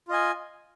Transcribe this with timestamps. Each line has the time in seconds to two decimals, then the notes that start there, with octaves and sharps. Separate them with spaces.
0.08 F4
0.11 D#5
0.13 G#5